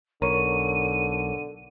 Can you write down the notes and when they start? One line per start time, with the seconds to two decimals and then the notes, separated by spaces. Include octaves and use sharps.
0.22 B1 D3 A#4 C#5 C#6 D#7